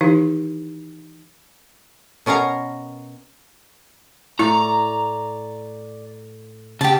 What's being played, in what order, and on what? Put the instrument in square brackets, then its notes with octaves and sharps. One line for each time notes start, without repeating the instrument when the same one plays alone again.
[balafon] D#3 E3 D#4 E4 G4 F5
[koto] B2 C#4 A#4 F5 A#5
[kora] A2 [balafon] E4 [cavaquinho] D5 [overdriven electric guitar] A#5
[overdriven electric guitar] C#3 [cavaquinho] G4 A5